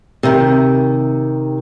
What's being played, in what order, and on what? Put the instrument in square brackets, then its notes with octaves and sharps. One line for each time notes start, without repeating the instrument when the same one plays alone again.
[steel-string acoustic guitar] C3 D#3